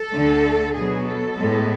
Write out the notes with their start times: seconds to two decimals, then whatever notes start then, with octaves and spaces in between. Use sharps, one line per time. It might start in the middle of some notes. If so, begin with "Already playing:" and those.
Already playing: A4
0.12 D2 D3 A3
0.74 B2 F#3 B3 G#4
1.06 A4
1.37 A2 G#3 B3